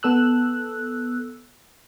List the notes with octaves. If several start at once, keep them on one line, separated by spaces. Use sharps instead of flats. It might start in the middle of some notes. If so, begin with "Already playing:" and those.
B3 A4 E6 F#6